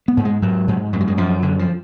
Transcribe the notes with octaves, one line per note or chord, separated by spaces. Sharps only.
B3
G#2
G#3
G#2 F#3
G#2
F#2 G#3
F#3
G#3
F#2 F3
F#2 D3
F3